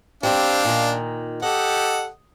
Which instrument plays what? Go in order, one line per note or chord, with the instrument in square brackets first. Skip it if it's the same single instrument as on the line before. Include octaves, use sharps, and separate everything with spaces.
[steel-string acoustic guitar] G3 C4 G4 [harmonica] D4 F5
[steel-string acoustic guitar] A#2 D#3
[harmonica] G4 A4 F#5 [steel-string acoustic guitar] D#5